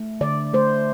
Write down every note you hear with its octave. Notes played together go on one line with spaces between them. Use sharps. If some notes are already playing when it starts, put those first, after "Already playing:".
Already playing: A3
D3 D5
A3 C5